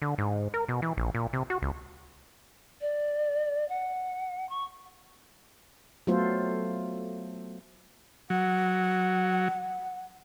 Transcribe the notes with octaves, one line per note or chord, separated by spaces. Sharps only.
D3
G#2
A#4
B2
E3
A#1
A#2
C3
F#4
C#2
D5
F#5
C#6
F#3 A3 B3 F4 A4 C5
F#3 F#5